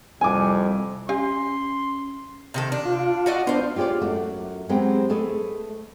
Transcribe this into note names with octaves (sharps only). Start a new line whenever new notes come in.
C2 F2 G#5 D6
C#4 G4 F5 G#5 C6
C3 D#3 A4
D4
F4
F#4 D5 D#5
B3 D4 F4 C5
F4 G4 G#4 C#5 D5
F#2 A3 F#4
F#3 G#3 B3 C4 G4
A3 G#4 B4 D#5